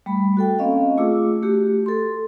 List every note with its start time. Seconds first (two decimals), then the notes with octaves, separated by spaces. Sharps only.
0.06 G3 A3 B5
0.37 F#4 A4 G5
0.59 A#3 C4 C#4 D#5 F5
0.98 A3 F4 G#4 D6 E6
1.43 A3 F#4 G4
1.86 A4 C6